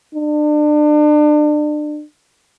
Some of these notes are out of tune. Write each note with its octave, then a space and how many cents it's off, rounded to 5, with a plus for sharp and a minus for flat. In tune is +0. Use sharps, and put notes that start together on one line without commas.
D4 +30